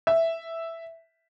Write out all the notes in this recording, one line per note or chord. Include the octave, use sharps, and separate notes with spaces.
E5